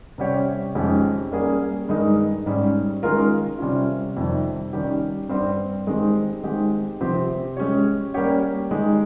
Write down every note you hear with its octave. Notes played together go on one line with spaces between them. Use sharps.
C3 G3 C#4 G4 C#5
F2 D#3 G#3 C#4 G4
G3 A#3 C#4 G#4
G2 D#3 G#3 D#4 A#4
G#2 G3 C#4
D#3 G#3 C#4 F4 A#4
C3 G3 C#4 F4
F2 C3 D#3 G3
D#3 G3 C#4 G4
G2 G3 C4 G4 C5
D#3 G#3 C4 G4
D#3 G#3 C4 G4
C3 F3 C4 G4
G#3 C#4 G4 C#5
G3 A#3 C#4 G4 C#5
D#3 G#3 D#4 G4